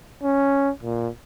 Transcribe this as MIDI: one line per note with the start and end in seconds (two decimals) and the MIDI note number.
0.23 0.70 61
0.83 1.08 46